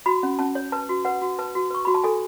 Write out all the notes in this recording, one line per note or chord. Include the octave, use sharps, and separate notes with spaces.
F#4 B5
C#4
C#4 A5
C#5
B4 A5
F#4
B4 F#5
F#4
B4 A5
F#4
B4 C#6
F#4 B5
A5
A4 G#5